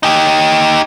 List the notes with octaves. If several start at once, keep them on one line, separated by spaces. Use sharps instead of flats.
D#4 G4